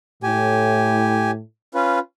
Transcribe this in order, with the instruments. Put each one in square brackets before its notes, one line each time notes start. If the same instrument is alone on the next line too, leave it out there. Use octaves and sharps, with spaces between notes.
[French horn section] A2 [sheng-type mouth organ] G4 G#5
[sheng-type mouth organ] C#4 F4 B4